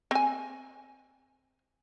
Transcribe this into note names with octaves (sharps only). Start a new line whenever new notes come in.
C4 G#5